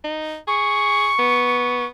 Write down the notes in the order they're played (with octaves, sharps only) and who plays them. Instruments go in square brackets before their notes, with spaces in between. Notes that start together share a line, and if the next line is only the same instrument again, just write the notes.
[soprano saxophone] D#4
[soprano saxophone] G#4 [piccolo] C#6
[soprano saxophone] B3